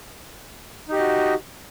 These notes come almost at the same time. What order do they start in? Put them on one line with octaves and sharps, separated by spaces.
D#4 G4 D#5 F#4